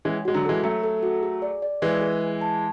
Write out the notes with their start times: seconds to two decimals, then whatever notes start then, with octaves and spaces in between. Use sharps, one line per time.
0.05 E3 G#3 C#4
0.25 G#3 F#4
0.34 D3 F#3
0.45 E3 G#3 A4
0.63 F#3 A3 C#4
0.83 A4
1.03 F#4
1.23 G#4
1.42 D5
1.62 D5
1.82 E3 G#3 B4
2.01 G#4
2.21 G#4
2.41 A5